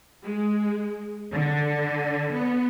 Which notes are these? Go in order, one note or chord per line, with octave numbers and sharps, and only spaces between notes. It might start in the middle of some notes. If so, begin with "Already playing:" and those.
G#3
D3
B3